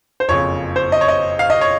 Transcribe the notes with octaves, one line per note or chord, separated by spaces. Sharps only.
C5
F#1 F2 C#3 C#5
C5
D#5
C#5
D#5
F5
D#5
C#5